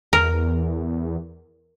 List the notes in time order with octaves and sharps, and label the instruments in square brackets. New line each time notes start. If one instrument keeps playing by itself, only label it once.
[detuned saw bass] E2 [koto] A#4